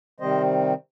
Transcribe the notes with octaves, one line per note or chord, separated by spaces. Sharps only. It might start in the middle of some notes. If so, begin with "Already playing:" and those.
C3 D#3 G3 C4 C5 D#5